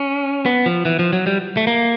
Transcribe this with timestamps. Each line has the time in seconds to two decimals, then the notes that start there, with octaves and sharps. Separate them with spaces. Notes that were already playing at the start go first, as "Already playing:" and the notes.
Already playing: C#4
0.46 B3
0.66 F3
0.85 E3
0.99 F3
1.13 F#3
1.27 G3
1.57 A3
1.67 A#3